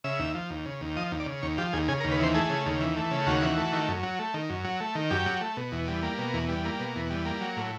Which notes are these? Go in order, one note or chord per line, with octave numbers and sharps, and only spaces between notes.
C#3 E5
D#2
F3
D#2
C#3
D#2
F3 D#5
D#2
D5
C#3
D#2 C#5
F3 G4
D#2 G#4
C#3 G#4
A#4
D#2
B4
E3 C5
A3 G#4
C#3
D#2
E3
A3
C#3
D#2 F#4
E3
A3
D#3
F#2
F#3
A3
D#3
F#2
F#3
A3
D#3
F#2 G4
F#3
A3
B2
E2
G3
A#3
B2
E2
G3
A#3
B2
E2
G3
A#3
F#3
A2